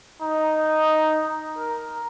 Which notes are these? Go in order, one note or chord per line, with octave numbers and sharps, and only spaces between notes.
D#4
A#4